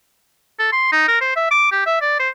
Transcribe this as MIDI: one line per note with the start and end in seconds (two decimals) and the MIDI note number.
0.59 0.68 69
0.72 0.91 84
0.92 1.03 63
1.08 1.20 70
1.21 1.33 72
1.36 1.49 76
1.51 1.67 86
1.72 1.85 67
1.86 1.98 76
2.01 2.19 74
2.19 2.29 72